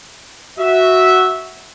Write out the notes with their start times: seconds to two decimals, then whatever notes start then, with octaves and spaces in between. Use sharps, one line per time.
0.59 F#4 E5